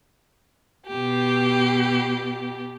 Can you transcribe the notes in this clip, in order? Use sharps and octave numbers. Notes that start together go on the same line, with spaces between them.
B2 G4